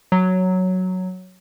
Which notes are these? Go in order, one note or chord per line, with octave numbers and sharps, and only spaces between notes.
F#3